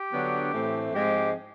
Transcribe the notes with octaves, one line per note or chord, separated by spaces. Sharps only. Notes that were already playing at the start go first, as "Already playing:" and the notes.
Already playing: G4
D3 F#3 B3 D4
A2 E3 A3 C4
G#2 F3 G#3 C4 G4